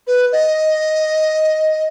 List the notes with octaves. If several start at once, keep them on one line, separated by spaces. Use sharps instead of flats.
B4
D#5